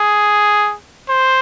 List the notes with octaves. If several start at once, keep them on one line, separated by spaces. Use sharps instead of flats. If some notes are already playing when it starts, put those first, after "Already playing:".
Already playing: G#4
C5